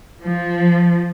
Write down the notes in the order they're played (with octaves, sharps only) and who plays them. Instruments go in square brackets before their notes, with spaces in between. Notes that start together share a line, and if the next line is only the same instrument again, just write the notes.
[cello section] F3